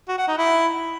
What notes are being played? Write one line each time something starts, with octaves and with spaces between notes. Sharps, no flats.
F#4
F#5
D#4
E4